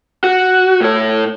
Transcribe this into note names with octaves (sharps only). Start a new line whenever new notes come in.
F#4
A2 C#5